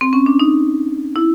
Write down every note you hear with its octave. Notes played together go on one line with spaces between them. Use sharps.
C4
C#4
D4
D#4
E4